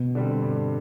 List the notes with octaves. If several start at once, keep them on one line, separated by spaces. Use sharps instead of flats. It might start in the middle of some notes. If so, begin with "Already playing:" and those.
Already playing: B2
D3 G3 C4
G2